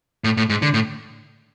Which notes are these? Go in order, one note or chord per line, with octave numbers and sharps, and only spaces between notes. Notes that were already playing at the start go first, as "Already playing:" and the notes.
A2
A2
G#2
D3
A2